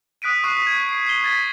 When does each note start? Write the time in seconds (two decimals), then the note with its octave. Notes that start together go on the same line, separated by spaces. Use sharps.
0.22 D#6 F#6 B6 D7 D#7
0.44 C#6 D#6 F#6 C7
0.67 G#6
0.89 C7
1.07 C7 G7
1.24 G#6 A6 B6